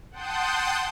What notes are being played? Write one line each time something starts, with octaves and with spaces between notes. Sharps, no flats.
F#5 G5 A5 C6 D#6 G6